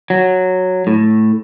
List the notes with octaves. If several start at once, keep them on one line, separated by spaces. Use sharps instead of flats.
F#3
A2